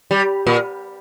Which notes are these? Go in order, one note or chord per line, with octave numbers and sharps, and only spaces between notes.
G3
A#2